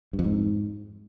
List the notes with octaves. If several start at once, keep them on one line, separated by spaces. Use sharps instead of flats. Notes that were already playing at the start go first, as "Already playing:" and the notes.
G2
F2
G#2